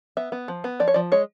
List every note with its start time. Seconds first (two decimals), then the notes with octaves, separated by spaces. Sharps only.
0.17 B3 E5
0.32 B3
0.48 F3
0.64 B3
0.80 F3 D5
0.88 C#5
0.94 F3 D5
1.12 G#3 C#5